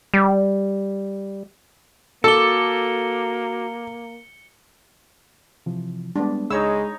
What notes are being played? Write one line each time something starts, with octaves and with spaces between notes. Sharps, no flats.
G3
A#3 F#4 A4 D6 C#7 G7
C3 E3 F3
G3 G#3 B3 D4
C#2 G#3 D#4 C#5 B5 E6